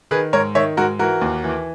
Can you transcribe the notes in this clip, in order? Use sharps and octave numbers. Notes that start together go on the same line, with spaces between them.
D#3 G#4 B4
G#2 A#4 C#5
D#3 C#5 E5
G#2 F#4 A#4
E3 F#4 A#4
D#2
E3